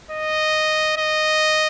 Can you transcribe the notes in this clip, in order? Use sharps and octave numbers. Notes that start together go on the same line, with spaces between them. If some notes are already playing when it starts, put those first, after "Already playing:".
D#5
D#5